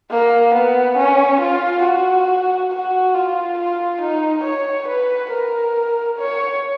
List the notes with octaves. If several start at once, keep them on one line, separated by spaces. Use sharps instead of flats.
A#3
B3
C#4
F4
F#4
F#4
F4
F4
D#4
C#5
B4
A#4
C#5